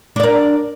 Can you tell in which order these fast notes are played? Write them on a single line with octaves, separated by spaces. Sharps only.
D4 D5 A#4